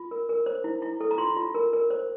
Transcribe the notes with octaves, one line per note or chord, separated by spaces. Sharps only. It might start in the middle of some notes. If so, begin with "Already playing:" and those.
Already playing: F4
A#4
A#4
C5
E4
E4
A4
A#5
F4 C6
F4
A#4
A#4
C5